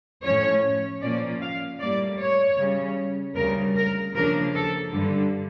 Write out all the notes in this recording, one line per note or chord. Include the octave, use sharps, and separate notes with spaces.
A2 F3 C#4 C#5
A#2 F3 A#3 C#4 D5
F5
A2 G3 A#3 D5
C#5
C#3 G3 C#4
D2 C#3 G3 A#4
A#4
C#3 F3 A#3 D4 A#4
A4
G2 D3 G3